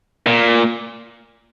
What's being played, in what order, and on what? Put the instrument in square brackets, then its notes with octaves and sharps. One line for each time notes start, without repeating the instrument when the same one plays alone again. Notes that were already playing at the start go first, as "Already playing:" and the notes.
[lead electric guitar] A#2